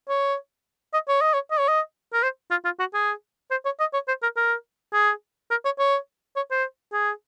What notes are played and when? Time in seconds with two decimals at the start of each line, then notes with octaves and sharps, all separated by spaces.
0.09 C#5
0.93 D#5
1.08 C#5
1.21 D#5
1.34 C#5
1.51 D#5
1.59 C#5
1.68 D#5
2.13 A#4
2.23 C5
2.50 F4
2.64 F4
2.79 F#4
2.94 G#4
3.51 C5
3.65 C#5
3.80 D#5
3.93 C#5
4.08 C5
4.22 A#4
4.36 A#4
4.93 G#4
5.50 A#4
5.65 C#5
5.79 C#5
6.36 C#5
6.51 C5
6.93 G#4